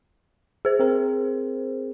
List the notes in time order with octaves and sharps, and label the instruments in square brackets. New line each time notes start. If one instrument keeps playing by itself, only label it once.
[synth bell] G#4 C5
[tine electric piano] C4 A#4